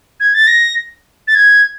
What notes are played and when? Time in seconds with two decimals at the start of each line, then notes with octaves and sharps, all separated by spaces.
0.20 G#6
0.34 A6
0.47 A#6
1.28 A6
1.35 G#6